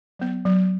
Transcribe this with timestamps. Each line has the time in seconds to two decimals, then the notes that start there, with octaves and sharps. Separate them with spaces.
0.19 F#3 B3
0.45 F#3